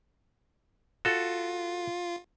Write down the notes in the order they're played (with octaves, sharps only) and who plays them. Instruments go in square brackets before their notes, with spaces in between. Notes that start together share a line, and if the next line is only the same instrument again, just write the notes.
[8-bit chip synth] F4 [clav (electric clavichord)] F#4 A4